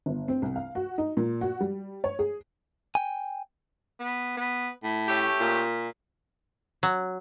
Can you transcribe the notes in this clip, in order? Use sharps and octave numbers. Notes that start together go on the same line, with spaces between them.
G1
C4
C2
F5
F#4
D#4
A#2
F#4
G3
C#5
G#4
G5 G#5
B3
B3
A2
A3 C#4 G4
A#2
F#3